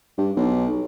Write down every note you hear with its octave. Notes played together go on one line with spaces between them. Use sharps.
G2
B1